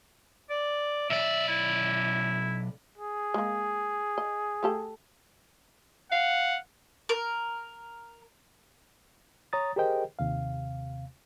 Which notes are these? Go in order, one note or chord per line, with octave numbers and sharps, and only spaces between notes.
D5
B1 D5 E5
E4
G#4
G#3 A#3
D#5
A3 G4 A4
F5 F#5
A#4
C#5 A#5 D#6 A6
G4 G#4 A#4 C5 D#5 G5
D#2 C3 F5